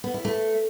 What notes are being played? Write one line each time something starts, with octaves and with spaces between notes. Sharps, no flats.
B3
E4
A3